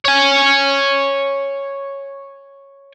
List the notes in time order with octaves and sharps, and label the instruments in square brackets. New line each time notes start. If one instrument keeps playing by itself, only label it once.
[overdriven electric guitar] C#5 G#5